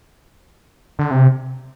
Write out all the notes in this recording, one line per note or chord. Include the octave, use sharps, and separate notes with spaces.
D3
C3